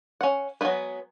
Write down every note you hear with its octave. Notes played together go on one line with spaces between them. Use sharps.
C#4 F#5
F#3 G#3 B3 E4 B4